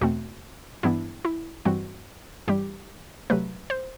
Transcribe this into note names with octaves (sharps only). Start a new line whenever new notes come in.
E2 B2 A3 C4 F#4
G2 E3 B3 D4 E4
E4
G2 E3 G3 C4 F#4
G2 E3 G3 G4
C3 F#3 A3 B4
C5